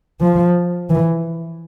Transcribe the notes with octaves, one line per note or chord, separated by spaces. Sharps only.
F3
E3